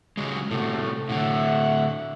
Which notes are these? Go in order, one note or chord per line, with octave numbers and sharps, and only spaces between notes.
C#3 F#3 G#3
A2 C3 A3 F#4 A4
A2 D3 E5 F#5